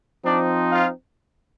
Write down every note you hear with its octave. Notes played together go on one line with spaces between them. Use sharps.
F3 C4 D4 D#4 D5
F4 F5